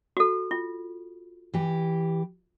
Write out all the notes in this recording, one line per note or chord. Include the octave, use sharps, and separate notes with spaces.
F#4 A4
F4
E3 G4